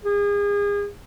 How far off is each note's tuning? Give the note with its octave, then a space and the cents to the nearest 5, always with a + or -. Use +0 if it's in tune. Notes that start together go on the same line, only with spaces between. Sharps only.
G#4 -35